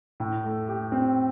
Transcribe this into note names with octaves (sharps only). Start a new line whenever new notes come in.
A2
A3
G4
C4